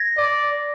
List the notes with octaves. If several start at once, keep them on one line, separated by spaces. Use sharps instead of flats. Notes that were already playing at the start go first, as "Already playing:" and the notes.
Already playing: G#6 A#6
D5